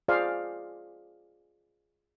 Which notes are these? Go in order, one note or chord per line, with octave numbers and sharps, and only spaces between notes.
F4 G#4 C5 D5 F5